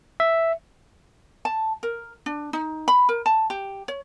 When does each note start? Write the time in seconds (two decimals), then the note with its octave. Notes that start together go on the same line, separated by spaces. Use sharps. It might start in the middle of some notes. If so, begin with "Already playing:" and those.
0.20 E5
1.45 A5
1.83 A#4
2.26 D4
2.53 D#4
2.88 B5
3.09 A#4
3.26 A5
3.50 G4
3.88 C#5